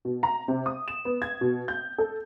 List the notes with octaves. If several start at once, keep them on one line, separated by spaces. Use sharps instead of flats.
B2
A#5
C3
D#6
E7
B3
G#6
B2
G6
A4